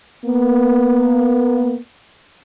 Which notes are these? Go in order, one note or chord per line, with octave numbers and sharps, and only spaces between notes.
A#3 B3